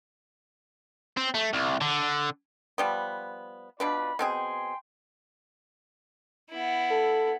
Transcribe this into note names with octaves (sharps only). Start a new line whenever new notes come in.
C4
A3
C2
D3
F3 G3 B3
B2 D4 F4 B4 D5 B5
B2 C4 G#4 G5 G#5 C6
B3 E4
A4